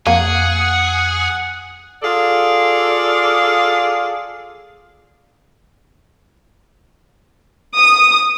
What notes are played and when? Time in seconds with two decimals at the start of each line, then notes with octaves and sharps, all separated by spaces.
0.07 F2 A#3 G#4 F#5
2.03 F4 G#4 A4 D5 F5
7.77 D#6